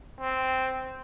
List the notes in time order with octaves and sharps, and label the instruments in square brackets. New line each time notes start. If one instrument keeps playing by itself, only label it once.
[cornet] C4